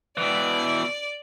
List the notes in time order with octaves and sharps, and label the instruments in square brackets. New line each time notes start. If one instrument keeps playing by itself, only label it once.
[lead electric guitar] B2 E3 [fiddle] D5